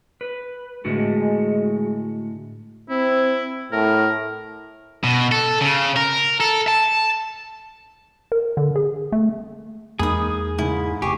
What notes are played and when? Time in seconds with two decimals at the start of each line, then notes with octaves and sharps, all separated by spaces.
0.21 B4
0.85 A2 D3 G#3 F#4
2.90 C4 E4
3.72 A2 A#4
5.04 B2
5.32 A4
5.61 C#3
5.97 A#4
6.40 A4
6.68 A5
8.32 A#4
8.57 D3
8.76 G#4
9.12 A3
9.99 E2 G#3 A#3 D#4 G#4 B5 D#6
10.59 G#2 C#3 E4
11.02 F1 G4 G#4 C#6 D6